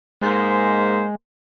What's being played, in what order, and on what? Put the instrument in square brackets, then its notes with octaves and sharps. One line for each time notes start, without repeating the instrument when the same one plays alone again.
[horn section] G#2 A#3 C5 [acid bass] G#3